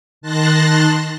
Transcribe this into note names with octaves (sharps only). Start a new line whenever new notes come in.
D#3 A5 C6 F#6 A6 A#6